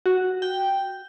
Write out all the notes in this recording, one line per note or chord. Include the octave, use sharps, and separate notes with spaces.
F#4
G5